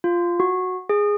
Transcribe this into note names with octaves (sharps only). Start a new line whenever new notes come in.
F4
F#4
G#4